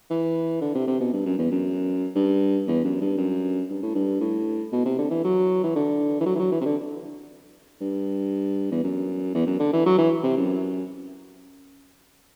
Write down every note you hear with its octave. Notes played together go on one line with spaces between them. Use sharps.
E3
D3
C3
C3
B2
G2
F#2
E2
F#2
G2
E2
F#2
G2
F#2
G2
A2
G2
A2
B2
C3
D3
E3
F#3
E3
D3
E3
F#3
E3
F#3
E3
C3
D3
G2
E2
F#2
E2
F#2
D3
E3
F#3
E3
C3
F#2